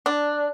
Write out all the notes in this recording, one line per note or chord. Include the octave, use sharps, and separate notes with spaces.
D4